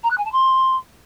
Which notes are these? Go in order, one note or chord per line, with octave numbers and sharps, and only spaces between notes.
A#5
F#6
G#5
A5
C6